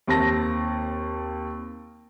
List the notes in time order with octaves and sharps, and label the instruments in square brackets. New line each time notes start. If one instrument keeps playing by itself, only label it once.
[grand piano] D#2 C4 A5 A#6